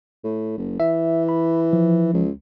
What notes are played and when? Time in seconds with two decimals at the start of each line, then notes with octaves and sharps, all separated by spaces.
0.24 A2
0.57 F#1
0.80 E3 E5
1.29 B5
1.73 F3
2.14 C#2